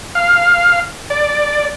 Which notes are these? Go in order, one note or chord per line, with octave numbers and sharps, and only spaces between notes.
F5
D5